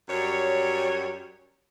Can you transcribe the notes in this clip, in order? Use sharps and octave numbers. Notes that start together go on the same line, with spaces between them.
F#2 G3 C#5